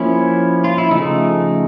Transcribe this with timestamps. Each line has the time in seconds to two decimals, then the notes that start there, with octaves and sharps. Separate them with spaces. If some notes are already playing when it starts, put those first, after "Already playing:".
Already playing: F3 A#3 C#4 E4
0.64 F4
0.78 E4
0.91 C#3 F3 A3 D#4